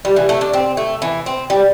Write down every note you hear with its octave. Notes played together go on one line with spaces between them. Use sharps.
G3
E3
A3
D4
C4
A3
E3
C4
G3